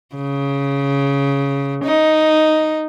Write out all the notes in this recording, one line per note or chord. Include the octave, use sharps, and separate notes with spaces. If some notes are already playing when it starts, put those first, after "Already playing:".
C#3
D#4